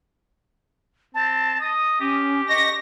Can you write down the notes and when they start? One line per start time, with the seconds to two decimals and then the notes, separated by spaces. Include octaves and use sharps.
1.15 C4 A5
1.61 D#5 D#6
2.00 C#4 G4
2.49 D#5 C#6 A#6